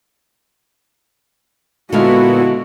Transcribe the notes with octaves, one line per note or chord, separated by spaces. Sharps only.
A#2 D3 G#3 B3 E4 F#4 F5